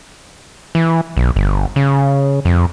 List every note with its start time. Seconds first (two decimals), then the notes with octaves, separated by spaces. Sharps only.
0.75 E3
1.17 B1
1.36 G1
1.76 C#3
2.45 F2